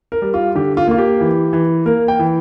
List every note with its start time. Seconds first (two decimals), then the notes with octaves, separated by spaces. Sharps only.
0.12 A#4
0.22 G3
0.34 F4
0.55 D3 G4
0.77 F4
0.88 A#3 F4
0.98 G4
1.21 E3
1.53 E3
1.86 A#3 A#4
2.08 G5
2.19 E3